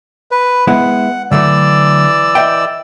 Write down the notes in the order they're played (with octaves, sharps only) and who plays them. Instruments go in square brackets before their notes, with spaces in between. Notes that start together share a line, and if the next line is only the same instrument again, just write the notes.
[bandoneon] B4
[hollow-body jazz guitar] G#3 B3 E4 [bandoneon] F#5
[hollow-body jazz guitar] D3 F#3 A3 [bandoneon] E3 D5 E6
[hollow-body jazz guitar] D#5 E5 G5